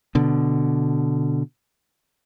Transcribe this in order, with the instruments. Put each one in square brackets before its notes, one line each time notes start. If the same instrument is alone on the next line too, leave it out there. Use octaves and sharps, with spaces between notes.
[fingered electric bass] B2 D3